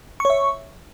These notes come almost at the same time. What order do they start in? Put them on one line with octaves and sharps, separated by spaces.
C#6 C#5 E5